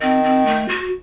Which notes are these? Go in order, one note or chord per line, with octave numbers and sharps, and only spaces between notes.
D#3 C4
C4
A3
F#4